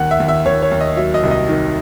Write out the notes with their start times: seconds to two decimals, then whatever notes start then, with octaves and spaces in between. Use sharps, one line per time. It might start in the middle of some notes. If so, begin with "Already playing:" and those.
Already playing: D#2 F#5
0.11 E5
0.20 D#2
0.28 E5
0.45 D#2 C#5
0.62 C#5
0.71 D#2
0.81 D#5
0.97 F#3 E5
1.14 D#5
1.23 C2
1.31 D#5
1.49 D#3